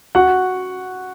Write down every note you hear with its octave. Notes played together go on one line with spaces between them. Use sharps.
F#4 F#5